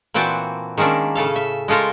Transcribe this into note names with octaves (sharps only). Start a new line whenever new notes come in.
A#2 E3 C4 F#4 G5 A5
D#3 G#3 A#3 C#4 D4
A2 C#3 A4 F5
E5
G#3 A3 F4 A4 A#4